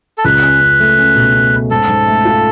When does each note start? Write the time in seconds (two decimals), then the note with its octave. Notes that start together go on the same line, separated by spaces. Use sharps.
0.18 A4
0.25 C#2 B4
0.43 C#4
0.61 C#4
0.80 A3
0.98 C#4
1.16 B2
1.35 C#4
1.53 C#4
1.70 G#2 A4
1.89 G#2
2.07 A3
2.25 F4